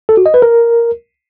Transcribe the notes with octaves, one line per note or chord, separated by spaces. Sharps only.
A4
F#4
D#5
B4
A#4